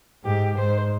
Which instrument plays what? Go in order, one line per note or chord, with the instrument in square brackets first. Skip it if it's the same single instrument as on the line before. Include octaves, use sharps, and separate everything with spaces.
[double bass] G#2 [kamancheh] G4
[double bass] G#2 [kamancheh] C5